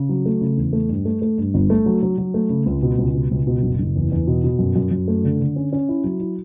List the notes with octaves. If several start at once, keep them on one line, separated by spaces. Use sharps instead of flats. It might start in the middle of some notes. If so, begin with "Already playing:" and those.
Already playing: C#3
F#3
A3
C#3
E2
A3
G2
A3
A3
G2
G1
A3
F#3
F#3
F#3
A3
C#3
C#2
B2
C#2
B2
C#2
B2
F#1
F#1
E2
E2
B2
B2
F#2
F#2
F#2
A3
D3
D3
C#4
C#4
E4
F#3
E4